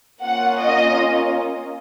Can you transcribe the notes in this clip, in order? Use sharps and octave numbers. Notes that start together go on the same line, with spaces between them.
A#3 C#4 F4 F#5
D#5